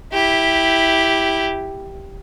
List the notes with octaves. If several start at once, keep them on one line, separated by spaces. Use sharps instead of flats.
E4 G4